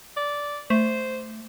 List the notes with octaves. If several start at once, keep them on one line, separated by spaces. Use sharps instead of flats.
D5
A3 C5